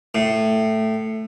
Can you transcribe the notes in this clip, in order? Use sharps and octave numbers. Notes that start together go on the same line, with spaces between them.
A2